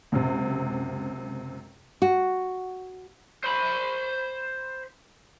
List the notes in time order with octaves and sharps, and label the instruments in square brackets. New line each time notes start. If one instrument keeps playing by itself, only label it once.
[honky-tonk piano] C#2 F#2 C3
[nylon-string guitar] F#4
[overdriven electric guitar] C5 B5